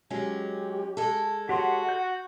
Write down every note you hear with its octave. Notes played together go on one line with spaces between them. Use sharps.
F#3 G#3 C#4 G4
G#3 A4
F#4 G4 C#5 F#5 C6
G6